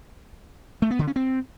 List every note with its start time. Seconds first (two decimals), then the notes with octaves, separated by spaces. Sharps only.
0.82 A3
0.91 B3
0.99 D3
1.07 C#4
1.16 C4